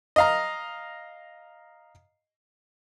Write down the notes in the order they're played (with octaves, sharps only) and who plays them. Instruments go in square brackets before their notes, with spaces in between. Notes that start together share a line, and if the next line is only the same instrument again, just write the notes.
[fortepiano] D#5 F5 A#5